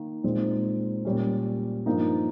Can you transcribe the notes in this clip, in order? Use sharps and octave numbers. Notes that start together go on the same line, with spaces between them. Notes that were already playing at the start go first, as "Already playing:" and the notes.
Already playing: D#3 A#3
A#2 G#3 C4 D#4
A#2 G3 C#4
G2 F3 A#3 D#4